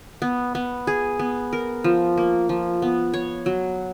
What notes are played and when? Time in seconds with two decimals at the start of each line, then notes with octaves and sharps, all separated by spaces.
0.22 B3
0.55 B3
0.87 G#4
1.19 B3
1.53 A#4
1.84 F3
2.17 A#3
2.49 F3
2.82 B3
3.14 C#5
3.46 F#3